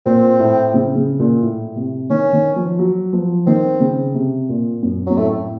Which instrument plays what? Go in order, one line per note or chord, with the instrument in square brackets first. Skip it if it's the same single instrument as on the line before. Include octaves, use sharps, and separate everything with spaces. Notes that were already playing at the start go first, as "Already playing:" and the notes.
[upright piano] A#2 [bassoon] C4
[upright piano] A2
C#3
C#3
A#2
A2
C3
[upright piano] D#3 [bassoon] C#4
[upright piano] D#3
F3
F#3
F3
[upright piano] D#3 [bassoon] C4
[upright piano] C#3
C3
A#2
F#2
[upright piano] F#2 [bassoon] F#3
[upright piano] A2 [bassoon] A3